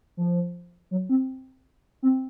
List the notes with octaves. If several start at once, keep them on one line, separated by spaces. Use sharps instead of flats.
F3
F#3
C4
C4